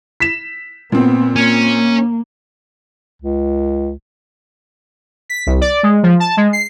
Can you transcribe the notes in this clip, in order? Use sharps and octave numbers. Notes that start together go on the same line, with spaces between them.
B6 E7
A#2 B3 C4
A#3 C#4
C#2
B6
C2
D5
G#3
F3
A5
G#3
C7